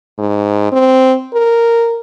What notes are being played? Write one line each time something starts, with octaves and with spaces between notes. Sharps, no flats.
G#2
C4
A#4